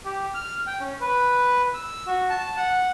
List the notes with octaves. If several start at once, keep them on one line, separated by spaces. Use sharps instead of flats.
G4
F6
G5
C#4
B4
E6
F#4
A5
F#5